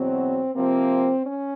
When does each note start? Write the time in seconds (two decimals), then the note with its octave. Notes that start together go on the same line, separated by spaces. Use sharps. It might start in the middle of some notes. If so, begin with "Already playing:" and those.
Already playing: E2 B2 F#3 C4
0.54 C3 F3 A#3 C4
1.25 C#4